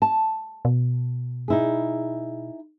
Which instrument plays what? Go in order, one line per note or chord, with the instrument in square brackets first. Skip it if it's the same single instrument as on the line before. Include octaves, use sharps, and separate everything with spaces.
[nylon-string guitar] A5
[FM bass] B2
[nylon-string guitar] D#4 E4 G#4